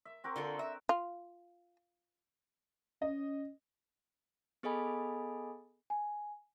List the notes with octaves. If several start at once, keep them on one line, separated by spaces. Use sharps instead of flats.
E5
C4 F#4 A#4
D3 F4 A4
E5
F4
C#4 D#5
B3 G#4 A4 D#5 G#5 B5
G#5